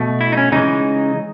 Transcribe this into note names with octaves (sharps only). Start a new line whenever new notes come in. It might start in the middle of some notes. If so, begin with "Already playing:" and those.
Already playing: B2 A3
E4
D#4
C#4
C#3 E3 G#3 D#4